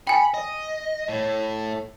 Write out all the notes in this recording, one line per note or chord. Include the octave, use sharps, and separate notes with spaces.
G5 G#5 B5
D#5
A2